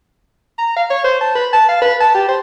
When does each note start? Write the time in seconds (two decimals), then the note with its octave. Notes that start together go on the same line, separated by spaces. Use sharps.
0.58 A#5
0.76 F5
0.90 C#5
1.04 C5
1.21 A5
1.35 B4
1.53 A5
1.68 F5
1.81 B4
2.00 A5
2.14 G4
2.28 C5